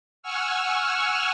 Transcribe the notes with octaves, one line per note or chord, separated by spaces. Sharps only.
F#5 G#5 C#6 E6 F6